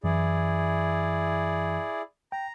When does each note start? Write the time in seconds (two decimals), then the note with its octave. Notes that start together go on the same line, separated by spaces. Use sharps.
0.04 F#2 E3 E4 G#4 D5
2.32 G5 A#5